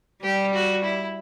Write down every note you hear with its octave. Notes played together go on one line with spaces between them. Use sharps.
G3 G4
F#4
E4